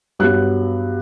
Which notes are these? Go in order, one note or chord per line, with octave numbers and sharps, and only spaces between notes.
G2 F#3 B3 F#6